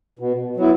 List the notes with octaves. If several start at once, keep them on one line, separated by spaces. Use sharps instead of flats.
B2
F#3 B3 E4